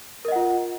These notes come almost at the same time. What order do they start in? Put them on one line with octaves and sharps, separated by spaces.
A#4 D#5 F#5 F4